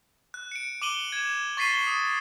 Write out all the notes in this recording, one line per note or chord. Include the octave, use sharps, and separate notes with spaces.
F#6
C#7 D7
D6 D#7 F#7 G7
G#6 E7
C#6 A6 B6 C7 D#7 G7
D#6